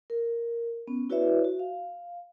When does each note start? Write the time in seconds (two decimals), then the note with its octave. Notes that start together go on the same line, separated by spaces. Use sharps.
0.10 A#4
0.87 B3 C#4
1.10 E4 F#4 B4 C#5 D5 E5
1.44 F#4
1.59 F5